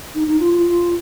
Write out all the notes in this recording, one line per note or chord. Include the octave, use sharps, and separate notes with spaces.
D#4
D#4
F4
F4
F4